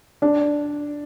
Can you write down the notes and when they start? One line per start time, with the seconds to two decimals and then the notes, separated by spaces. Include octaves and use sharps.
0.22 D4